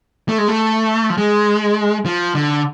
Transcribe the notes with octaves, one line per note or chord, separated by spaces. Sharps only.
A3
G#3
A3
F3
G#3
F3
D3